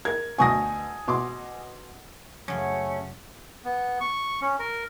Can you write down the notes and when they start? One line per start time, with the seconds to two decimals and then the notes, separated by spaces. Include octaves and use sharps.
0.05 A#4 G#6
0.38 D2 B2 G#5 C#6 D#6 A#6
1.08 B2 C6 D6
2.48 F#2 C#3 A3 C#4
3.65 B3
4.01 C#6
4.42 C#4
4.59 A#4